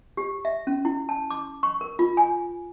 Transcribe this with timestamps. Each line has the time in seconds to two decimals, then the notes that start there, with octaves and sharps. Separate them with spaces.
0.17 G4
0.45 E5
0.67 C#4
0.85 E4
1.09 A5
1.31 D6
1.63 C#6
1.81 A#4
1.99 F4
2.17 G#5